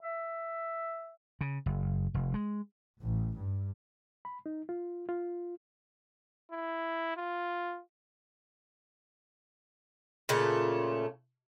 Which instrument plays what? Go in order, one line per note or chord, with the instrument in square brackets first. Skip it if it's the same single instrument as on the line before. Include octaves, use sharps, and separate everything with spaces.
[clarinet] E5
[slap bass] C#3
F#1
F1
G#3
[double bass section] A1
G2
[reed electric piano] B5
D#4
F4
F4
[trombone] E4
F4
[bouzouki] A#2 C#3 A3 F4